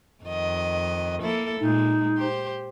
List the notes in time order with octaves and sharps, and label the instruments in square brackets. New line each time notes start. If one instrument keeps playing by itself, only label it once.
[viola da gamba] F2 D#3 D#5
A#3 E4 A4
[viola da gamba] A#2 G#3 [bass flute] D#4
[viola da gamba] G4 C5